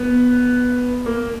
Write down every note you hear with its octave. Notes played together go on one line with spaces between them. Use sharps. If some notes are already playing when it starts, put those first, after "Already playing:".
Already playing: B3
A#3